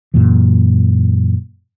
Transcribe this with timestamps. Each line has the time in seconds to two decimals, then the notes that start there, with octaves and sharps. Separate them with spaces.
0.14 F#2 A#2 E3